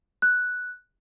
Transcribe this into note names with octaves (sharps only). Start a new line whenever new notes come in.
F#6